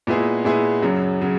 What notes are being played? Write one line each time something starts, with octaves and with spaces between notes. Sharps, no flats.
A#2 G#3 B3 E4 G#4
A#2 G#3 B3 E4 G#4
F#2 C#3 F#3
C#3 F#3